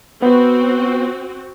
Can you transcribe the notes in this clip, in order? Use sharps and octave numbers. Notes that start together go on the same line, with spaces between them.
B3 C4 F#4